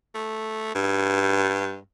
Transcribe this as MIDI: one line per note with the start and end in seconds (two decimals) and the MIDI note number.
0.15 0.72 57
0.75 1.78 43